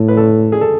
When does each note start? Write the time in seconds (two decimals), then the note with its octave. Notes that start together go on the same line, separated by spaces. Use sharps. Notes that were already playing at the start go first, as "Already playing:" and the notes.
Already playing: A2 A4
0.08 B4
0.17 A4
0.52 G#4
0.61 A4